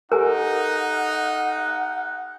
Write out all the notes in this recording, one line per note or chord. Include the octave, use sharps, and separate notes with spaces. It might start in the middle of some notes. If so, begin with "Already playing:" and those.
D#4 G4 A4 A#4 F#5 G#5